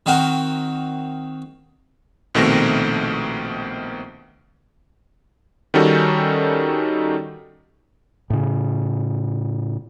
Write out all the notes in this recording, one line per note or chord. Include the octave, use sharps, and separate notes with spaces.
D#3 C4 F#4 A#4
A#1 B2 D#3 A3 C4 A#6
D#3 G3 C#4 D#4 F#4 A4
A2 C#3